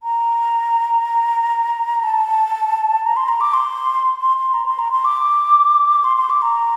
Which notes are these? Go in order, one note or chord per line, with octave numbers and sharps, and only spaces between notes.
A#5
A5
A#5
C6
A#5
D6
C6
C6
C6
A#5
C6
A#5
C6
D6
C6
C6
D6
A#5